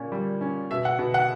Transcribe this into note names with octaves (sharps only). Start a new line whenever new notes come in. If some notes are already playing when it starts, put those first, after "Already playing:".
Already playing: A#2 C#4
G3
C#4
B2 E5
F#5
B2
F#5